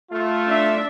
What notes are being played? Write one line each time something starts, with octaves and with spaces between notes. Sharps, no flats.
A3 F4
D4 E5